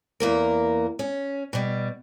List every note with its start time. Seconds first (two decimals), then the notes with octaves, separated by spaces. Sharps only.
0.20 E2 A#3 A#4
0.99 C#4
1.53 B2 G3